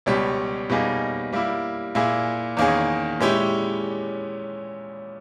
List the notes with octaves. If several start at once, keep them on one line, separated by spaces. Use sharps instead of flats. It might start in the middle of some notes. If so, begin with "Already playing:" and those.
C#2 B2 G3 C#4 G4
B2 G3 A#3 D#4 G#4
G3 A#3 E4
A#2 A#3 E4 G#4
E2 D#3 A#3 C#4 G#4
A#2 G#3 C#4 E4 G4